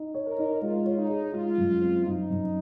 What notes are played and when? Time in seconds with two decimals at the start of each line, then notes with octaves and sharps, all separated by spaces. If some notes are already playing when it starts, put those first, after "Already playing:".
Already playing: D#4
0.14 C#5
0.26 A#4
0.38 D#4
0.62 G#3 F4
0.85 C#5
0.98 D#4
1.09 G#4
1.34 G#3 F4
1.58 F#2
1.81 C4
2.06 F#2 D#4
2.30 F#2